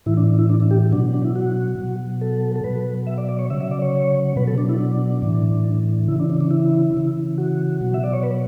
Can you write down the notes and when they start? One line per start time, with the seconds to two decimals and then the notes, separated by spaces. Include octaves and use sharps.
0.06 A2 E3 E4
0.17 D4
0.27 D4
0.39 E4
0.49 D4
0.60 D4
0.71 G4
0.92 B2 F#3 D4
1.14 D4
1.25 E4
1.35 F#4
1.79 B2 F#3
2.21 A4
2.56 A4
2.64 B2 F#3 B4
3.07 E5
3.18 D5
3.29 D5
3.39 C#5
3.50 C#3 F#3 E5
3.61 E5
3.71 D5
3.82 C#5
4.36 B2 F#3 B4
4.47 A4
4.58 D4
4.69 E4
4.79 D4
5.22 A2 E3
6.08 C#3 E4
6.12 E3
6.20 D4
6.30 D4
6.40 D4
6.51 E4
6.94 C#3 E3
7.38 F#4
7.81 B2 F#3
7.94 E5
8.04 D5
8.13 C#5
8.23 B4